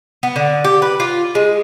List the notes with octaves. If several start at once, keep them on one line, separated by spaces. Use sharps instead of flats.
B3
D3
G4
B4
F4
G#3